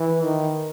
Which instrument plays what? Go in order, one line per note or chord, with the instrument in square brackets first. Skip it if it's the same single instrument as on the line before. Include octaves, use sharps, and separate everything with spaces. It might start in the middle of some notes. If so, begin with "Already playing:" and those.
Already playing: [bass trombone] E3
D#3